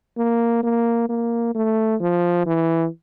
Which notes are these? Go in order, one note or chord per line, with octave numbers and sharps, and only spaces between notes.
A#3
A#3
A#3
A3
F3
E3